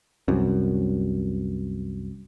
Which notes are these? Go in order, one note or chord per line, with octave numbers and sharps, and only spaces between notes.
C2 F#2